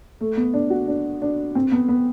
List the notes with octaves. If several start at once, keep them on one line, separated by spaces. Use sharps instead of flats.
A3
B3
D4
F#4
D4
D4
C4
B3
B3